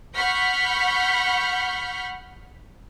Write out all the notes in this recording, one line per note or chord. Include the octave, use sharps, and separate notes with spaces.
F#5 B5 C#6 F6 G6 B6